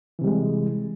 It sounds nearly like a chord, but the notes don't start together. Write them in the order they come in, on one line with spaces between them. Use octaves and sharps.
E3 C3 G3 G#3